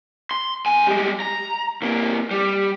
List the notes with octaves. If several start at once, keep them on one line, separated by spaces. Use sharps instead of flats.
C6
F2 G#5
G3 G#3
A#5
C3 A#3
G3